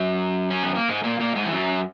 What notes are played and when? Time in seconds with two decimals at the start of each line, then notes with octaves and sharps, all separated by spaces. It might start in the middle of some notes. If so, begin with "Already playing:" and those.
Already playing: F#2 F#3
0.50 C#4
0.63 B3
0.75 A#3
0.88 G#2 G#3
1.04 A#2 A#3
1.20 A#2 A#3
1.36 G#2 G#3
1.45 E3
1.51 F#2 F#3